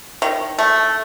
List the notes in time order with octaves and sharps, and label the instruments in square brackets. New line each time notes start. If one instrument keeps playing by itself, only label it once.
[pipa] D#3
A3